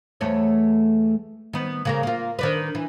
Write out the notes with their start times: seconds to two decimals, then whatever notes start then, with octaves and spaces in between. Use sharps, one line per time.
0.21 E2 A3 C#5
1.53 D#3 B3
1.85 C#3 A#3 A#4
2.03 A#3 F4
2.39 D#3 D4 B4
2.75 E3